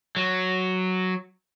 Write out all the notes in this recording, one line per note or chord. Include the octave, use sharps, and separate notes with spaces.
F#3